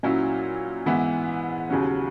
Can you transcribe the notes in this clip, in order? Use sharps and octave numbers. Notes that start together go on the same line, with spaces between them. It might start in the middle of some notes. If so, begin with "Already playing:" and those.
A#2 F#3 C#4 E4
G#2 E3 B3 E4
D#2 C#3 F#3 C#4